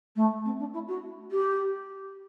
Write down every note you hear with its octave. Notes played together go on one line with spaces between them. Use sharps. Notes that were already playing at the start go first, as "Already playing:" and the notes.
A3
C4
D4
E4
F#4
G4